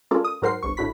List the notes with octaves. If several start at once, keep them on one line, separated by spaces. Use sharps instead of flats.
G#3 C#4 F4 A4 A#4 D5
D#6
G#2 F#3 A#4 C5 F#5 C7
G1 C2 C#6
G#1 A2 D3 F#4 B5 B6